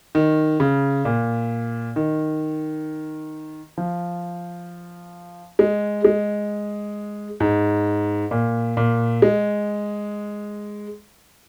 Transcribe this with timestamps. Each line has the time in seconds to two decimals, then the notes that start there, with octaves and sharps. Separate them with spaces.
0.15 D#3
0.60 C#3
1.05 A#2
1.96 D#3
3.78 F3
5.59 G#3
6.05 G#3
7.40 G#2
8.31 A#2
8.77 A#2
9.22 G#3